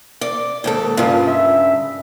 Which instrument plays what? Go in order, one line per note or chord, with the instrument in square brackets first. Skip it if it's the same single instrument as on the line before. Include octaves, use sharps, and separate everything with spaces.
[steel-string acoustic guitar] D5
D#2 G#2 A4
[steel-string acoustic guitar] G2 C#3 [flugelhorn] F4
[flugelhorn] E5